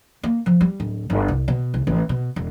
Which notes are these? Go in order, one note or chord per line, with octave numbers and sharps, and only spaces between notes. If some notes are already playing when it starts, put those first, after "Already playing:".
A#3
F3
G3
D1
G1
C2
B2
C2
A1
B2
E1